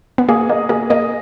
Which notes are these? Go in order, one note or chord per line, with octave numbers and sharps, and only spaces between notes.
B3
A#3 G#4
A#3 D#5
A#3 G#4
A#3 D#5